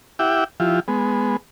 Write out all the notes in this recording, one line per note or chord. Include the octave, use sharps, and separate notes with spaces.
E4 G4 E5 F#5 G5 D6
F3 E4 F4 G4
G#3 B3